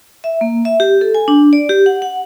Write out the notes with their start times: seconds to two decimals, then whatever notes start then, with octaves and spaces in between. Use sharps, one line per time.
0.24 E5
0.41 A#3
0.65 E5
0.80 G4
1.01 A4
1.15 G#5
1.28 D4
1.53 D5
1.69 G4
1.86 F#5
2.02 F#5